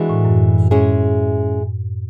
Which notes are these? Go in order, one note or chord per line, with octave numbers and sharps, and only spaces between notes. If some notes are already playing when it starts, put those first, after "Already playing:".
Already playing: E3 G#3 D4 F#4
A2
F#2
G#3 C#4 E4 G#4